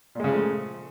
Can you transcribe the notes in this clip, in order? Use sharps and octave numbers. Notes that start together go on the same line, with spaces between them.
A#2 C#3 F3 G#3 A3